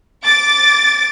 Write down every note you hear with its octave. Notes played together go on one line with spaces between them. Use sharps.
D6 A6